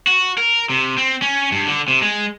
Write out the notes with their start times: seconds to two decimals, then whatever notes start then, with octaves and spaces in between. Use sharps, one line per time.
0.07 F#4
0.38 A#4
0.70 C3
0.98 C4
1.22 C#4
1.52 G2
1.67 D3
1.88 C3
2.02 G#3